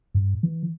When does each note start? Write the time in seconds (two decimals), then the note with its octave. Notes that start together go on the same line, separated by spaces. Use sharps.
0.15 G2
0.43 E3